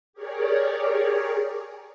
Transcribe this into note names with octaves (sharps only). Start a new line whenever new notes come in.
G4 G#4 A#4 C#5 D5